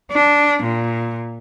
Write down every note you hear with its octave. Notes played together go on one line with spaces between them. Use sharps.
D4
A#2